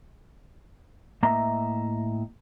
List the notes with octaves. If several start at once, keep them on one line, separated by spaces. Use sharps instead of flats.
A2 A#3 D#5 E5 A#5